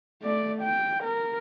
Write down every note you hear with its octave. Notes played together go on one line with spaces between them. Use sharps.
A3 D5
G5
A#4